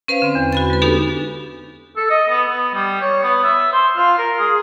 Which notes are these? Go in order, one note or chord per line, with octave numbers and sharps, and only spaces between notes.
C#4 B4 C5 F5
D3 C4
E2
F#4 B5 A6
G#3 B4
B3 D4 D#4 G4 A4
A4
D#5
B3
B3
G3
C#5
B3
E5
C5
F4
A#4
G#4